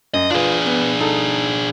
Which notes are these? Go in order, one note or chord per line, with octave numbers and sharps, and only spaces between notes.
F#2 D#5
D4 F4 G#4 B4
B3
D#4 A4